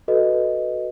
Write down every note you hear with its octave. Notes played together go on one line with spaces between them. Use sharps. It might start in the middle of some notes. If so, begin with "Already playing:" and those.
F#4 A4 B4 D#5